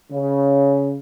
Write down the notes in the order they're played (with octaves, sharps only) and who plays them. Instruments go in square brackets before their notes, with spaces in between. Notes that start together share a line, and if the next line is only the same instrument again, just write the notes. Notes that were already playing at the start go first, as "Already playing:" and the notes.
[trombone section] C#3